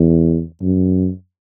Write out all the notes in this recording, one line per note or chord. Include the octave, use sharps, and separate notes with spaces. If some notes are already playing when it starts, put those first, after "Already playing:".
Already playing: E2
F#2